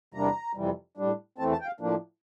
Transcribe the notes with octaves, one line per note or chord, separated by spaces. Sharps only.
E2 C3 G3 A#3 D4 A#5
F2 C3 E3 G3
A2 G3 D4
E2 E3 A3 C4 A5
A5
G5
F5
A2 F3 A#3 D4